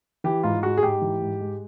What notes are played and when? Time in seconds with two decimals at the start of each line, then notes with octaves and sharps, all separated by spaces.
0.24 E3 G4
0.43 G#2 F4
0.63 G#3 F#4
0.77 G#4
0.83 G#2 G4
1.02 E3
1.22 G#2
1.41 G#3